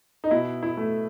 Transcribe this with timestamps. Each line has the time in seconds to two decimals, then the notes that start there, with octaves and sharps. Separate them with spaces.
0.24 D#4
0.31 B2 E4
0.63 E4
0.77 A3